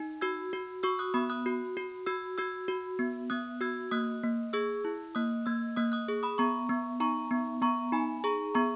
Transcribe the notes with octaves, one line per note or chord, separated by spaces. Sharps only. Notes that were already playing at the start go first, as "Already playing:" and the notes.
Already playing: D#4
F#4 E6 G#6
F#4
F#4 C#6 E6
D#6 F#6
B3 B5 D#6
D#6 F#6
F#4
F#4
F#4 E6 G#6
F#4 E6 G#6
F#4
B3
B3 D#6 F#6
F#4 E6 G#6
A#3 D#6 F#6
A#3
G#4 E6 G#6
E4
A#3 D#6 F#6
A#3 E6 G#6
A#3 D#6 F#6
D#6 F#6
G#4
B5 D#6
B3 A#5 C#6
B3
D#4 A#5 C#6
B3
B3 A#5 C#6
D#4 G#5 B5
G#4 A#5 C#6
B3 A#5 C#6